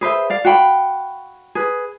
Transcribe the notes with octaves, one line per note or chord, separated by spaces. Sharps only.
G#4 B4 C5 E5
D5 F5
F#4 F5 G5 B5
G#4 B4